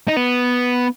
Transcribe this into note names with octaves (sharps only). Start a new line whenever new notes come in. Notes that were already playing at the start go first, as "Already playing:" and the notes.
D#4
B3